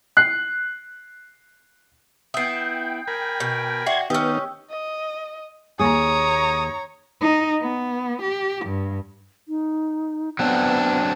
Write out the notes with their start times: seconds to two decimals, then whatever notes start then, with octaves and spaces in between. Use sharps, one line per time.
0.17 F#6 C7
2.34 B3 E4 G5 D#6 C7
3.07 A#4 G#5 B5
3.40 B2
3.86 F#4 D5 E5 F#5 G5 C6 G#6
4.10 D#3 B3 C#4 D#4 G4 G5 E6
4.70 D#5
5.79 D#2 A#3 G#4 C#5 A#5 D#6
7.21 D#4
7.61 B3
8.21 G4
8.65 G2
9.48 D#4
10.39 F#3 B3 C4 D4